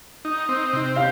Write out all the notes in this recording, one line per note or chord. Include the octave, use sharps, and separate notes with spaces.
D#4
C4
C3
G4 F5